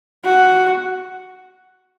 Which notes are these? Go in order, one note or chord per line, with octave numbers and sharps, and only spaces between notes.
F#4